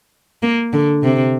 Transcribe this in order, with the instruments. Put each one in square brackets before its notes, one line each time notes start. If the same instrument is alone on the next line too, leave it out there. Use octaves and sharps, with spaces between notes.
[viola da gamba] A#3
D3
C3